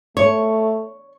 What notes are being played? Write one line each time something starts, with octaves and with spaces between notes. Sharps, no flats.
A3 C#5